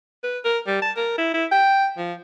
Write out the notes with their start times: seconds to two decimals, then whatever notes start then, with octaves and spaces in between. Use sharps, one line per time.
0.23 B4
0.45 A#4
0.67 G3
0.82 A5
0.97 A#4
1.18 E4
1.34 E4
1.52 G5
1.98 F3